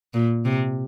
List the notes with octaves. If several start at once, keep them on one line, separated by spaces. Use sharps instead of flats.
A#2
C3